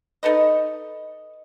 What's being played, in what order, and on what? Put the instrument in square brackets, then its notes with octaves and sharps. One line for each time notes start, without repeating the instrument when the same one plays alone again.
[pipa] D#4 A4 B4 D#5